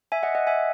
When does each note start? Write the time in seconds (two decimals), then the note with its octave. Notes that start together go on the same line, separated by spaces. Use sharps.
0.12 E5 G#5
0.23 D#5 F#5
0.35 D#5 F#5
0.47 E5 G#5